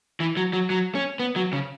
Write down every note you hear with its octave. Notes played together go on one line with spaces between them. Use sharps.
E3
F#3
F#3
F#3
C#4
B3
F#3
C#3